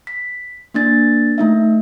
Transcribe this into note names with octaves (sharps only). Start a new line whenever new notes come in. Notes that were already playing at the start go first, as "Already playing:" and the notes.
B6
A#3 D4 A6
A3 D#4 E5